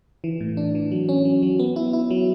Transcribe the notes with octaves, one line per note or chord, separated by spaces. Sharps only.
E3
A2
D4
E3
F#3
C#4
F#3
F#3
B3
E4
E4
F#3